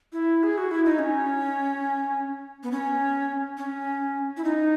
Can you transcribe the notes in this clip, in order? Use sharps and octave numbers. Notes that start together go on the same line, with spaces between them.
E4
G#4
F#4
E4
D#4
C#4
B3
C#4
C#4
E4
D#4